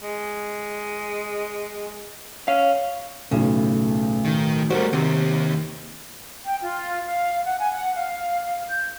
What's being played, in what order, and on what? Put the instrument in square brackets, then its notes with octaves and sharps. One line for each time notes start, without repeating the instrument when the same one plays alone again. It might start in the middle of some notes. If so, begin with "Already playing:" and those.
[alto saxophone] G#3
[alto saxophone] C#4 [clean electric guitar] F5
[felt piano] B1 A2 [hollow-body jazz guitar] C#3
[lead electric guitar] D#3
[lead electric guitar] G3 A3 [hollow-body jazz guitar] F#4 A#4 [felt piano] C5
[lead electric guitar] D#2 D#3 [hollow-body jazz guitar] C3
[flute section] G5
F4
F5
F#5
G#5
F#5
F5
G6